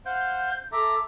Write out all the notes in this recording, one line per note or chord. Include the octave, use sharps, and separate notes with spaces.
C5 F5 F#5 G6
A4 E5 A#5 D6